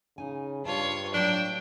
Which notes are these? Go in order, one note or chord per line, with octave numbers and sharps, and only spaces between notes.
C#3 D#4 G#5
G2 F4 C#5 A5
A2 F#3 G3 D4 G5